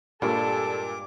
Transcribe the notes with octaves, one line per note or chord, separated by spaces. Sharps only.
G2 A#2 G3 G#3 A4 D6